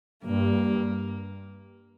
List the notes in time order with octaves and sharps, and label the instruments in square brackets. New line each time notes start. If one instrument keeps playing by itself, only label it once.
[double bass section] G2 [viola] A#3